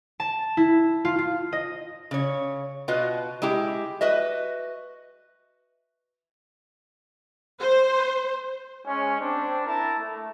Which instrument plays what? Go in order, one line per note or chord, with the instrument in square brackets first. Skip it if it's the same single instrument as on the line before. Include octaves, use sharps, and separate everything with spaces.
[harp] A5
E4
F4
F4
D#5
[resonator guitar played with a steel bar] C#3 C#5
B2 F4 F#4 B4 D#5
G#3 E4 G4
F#4 B4 D#5 E5
[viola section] C5
[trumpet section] G#3 C#4
C4 D4
E4 A#4 E5 A5
A3